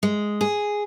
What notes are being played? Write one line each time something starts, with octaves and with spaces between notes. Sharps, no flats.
G#3
G#4